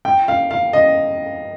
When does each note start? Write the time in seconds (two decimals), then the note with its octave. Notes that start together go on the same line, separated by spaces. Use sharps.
0.05 G5
0.28 F5
0.51 F5
0.73 D#5